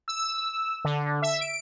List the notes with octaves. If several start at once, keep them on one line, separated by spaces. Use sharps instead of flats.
E6
D3
E5
D7